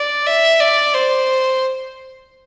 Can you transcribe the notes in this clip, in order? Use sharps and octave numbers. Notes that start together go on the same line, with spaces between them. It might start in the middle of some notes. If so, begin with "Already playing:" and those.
Already playing: D5
E5
D5
C5